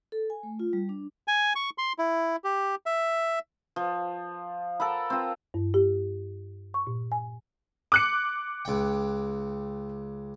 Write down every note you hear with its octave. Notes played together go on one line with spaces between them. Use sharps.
A4
G#5
A3
F4
G3
D4
G#5
C#6
C6
E4
G4
E5
F3
A4 A#4 F#5 B5
C4 F4
G2
G4
C#6
A#2
G#5
D6 F#6 C#7
C#2 G5